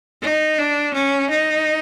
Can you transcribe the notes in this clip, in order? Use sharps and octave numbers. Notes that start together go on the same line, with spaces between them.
D#4
D4
C#4
D#4